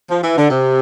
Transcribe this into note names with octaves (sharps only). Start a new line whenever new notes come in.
F3
E3
D3
C3